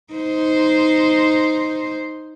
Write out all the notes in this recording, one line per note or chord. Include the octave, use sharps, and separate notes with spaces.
D#4 C5